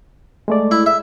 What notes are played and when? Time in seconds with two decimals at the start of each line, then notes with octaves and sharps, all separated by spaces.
0.48 G#3 A3 D5
0.71 E4
0.86 E5